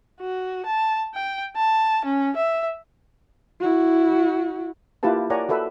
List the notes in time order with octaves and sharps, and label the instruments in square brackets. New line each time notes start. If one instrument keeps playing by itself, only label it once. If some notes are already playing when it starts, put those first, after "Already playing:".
[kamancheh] F#4
A5
G5
A5
C#4
E5
[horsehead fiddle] E4 F#4
[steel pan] A#3 E4 F4 G4 B4 A5
A#4 C#5 D5 F#5 G#5 A#5
F#4 A4 B4 E5